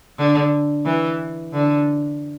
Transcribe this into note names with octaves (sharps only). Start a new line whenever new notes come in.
D3
E3
D3